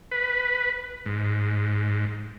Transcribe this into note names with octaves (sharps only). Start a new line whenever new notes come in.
B4
G#2